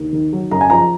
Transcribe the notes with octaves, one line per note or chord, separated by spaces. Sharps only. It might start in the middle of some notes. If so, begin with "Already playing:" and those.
Already playing: D#2
D#3
F#3
F#2 A#5
G#5
F3 A#5